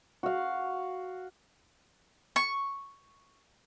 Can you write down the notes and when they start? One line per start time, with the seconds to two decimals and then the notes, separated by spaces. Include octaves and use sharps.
0.23 F#4 F5
2.36 C#6